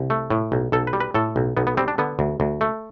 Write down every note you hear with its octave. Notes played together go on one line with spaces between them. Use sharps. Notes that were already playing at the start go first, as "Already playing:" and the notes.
Already playing: C2
A3
A2
B1
B1 A4
B4
G3
B4
A2 A4
B1
B1 B3
B3
G3 C4
D4
D3 B3
D2
D2
A3